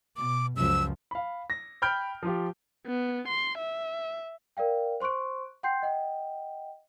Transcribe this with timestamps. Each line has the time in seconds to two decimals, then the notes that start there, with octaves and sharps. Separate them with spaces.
0.17 B2 D6
0.57 C#2 F#2 F3 E6
1.11 F5 B5
1.50 A#6
1.82 G5 B5 F6 G6 D7
2.23 F3 F4 G4
2.87 B3
3.28 C6
3.59 E5
4.57 A#4 D5 F5 G5
5.00 C5 C6 C#6 F#6 D7
5.63 F#5 G5 C6 G6 C7
5.82 D#5 F#5 G5